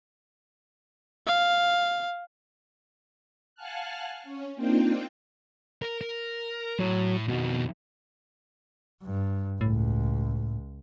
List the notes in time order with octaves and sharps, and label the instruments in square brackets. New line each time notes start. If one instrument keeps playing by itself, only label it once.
[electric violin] F5
[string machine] F5 F#5 G#5 A5 F6 F#6
C#4
A#3 C4 D4 D#4 F4 G5
[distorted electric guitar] A#4
A#4
[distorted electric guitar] A2 [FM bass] F#3
[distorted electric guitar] F2 D#3 [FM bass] B2
[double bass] G2
[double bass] C#2 [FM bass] A2